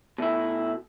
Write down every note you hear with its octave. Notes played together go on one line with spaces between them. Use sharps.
B2 A3 E4